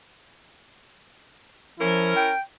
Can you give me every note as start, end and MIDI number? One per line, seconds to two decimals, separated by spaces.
1.79 2.12 53
1.79 2.31 61
1.79 2.31 64
1.79 2.31 70
2.16 2.41 79